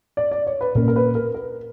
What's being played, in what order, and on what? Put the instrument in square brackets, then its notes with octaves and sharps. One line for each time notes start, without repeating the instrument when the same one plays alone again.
[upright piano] D5
D5
C#5
B4
[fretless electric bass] A#2 A#3 C#4 [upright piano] A#4
[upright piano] A#4
B4
A#4
A#4